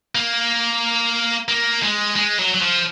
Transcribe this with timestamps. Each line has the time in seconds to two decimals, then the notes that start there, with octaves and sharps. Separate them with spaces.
0.15 A#3
1.48 A#3
1.83 G#3
2.16 G#3
2.39 F#3
2.54 F#3
2.61 F3